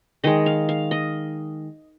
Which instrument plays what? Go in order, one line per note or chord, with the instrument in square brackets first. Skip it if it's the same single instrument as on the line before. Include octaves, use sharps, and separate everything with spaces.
[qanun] D#3 G#3 D#5
F5
F5
D#5